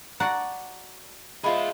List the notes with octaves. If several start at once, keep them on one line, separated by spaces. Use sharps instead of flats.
F#4 D5 F#5 A5 A#5
G#3 F4 G#4 C5 E5 B5